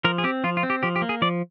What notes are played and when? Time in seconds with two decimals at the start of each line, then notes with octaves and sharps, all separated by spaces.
0.04 F3 A#4
0.18 G#4
0.24 C4 G4
0.44 F3 F4
0.57 F4
0.63 C4
0.70 G4
0.83 F3 G4
0.96 G4
1.02 A#3
1.09 G#4
1.22 F3 D5